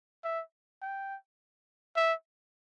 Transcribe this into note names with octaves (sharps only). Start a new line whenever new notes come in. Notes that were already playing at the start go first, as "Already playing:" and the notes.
E5
G5
E5